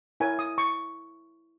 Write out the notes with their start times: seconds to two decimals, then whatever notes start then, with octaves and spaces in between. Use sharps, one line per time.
0.20 E4 A#4 C#5 G#5
0.39 D#6
0.58 C#6